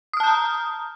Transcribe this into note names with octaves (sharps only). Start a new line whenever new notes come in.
A5 A#5 D#6 F6 G6